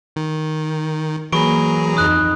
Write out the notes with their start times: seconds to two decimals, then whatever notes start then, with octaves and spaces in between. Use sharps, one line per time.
0.16 D#3
1.32 E3 F#3 A#3 G#4 A#5 B5 C#6 D7
1.97 F2 D#4 D#6 F#6